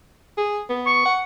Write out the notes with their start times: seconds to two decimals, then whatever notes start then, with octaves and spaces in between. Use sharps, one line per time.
0.37 G#4
0.69 B3
0.86 C#6
1.06 F#5